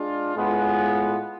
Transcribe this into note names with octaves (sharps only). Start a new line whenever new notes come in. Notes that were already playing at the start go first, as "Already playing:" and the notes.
Already playing: G#3 D4 F4
A2 G#3 B3 F4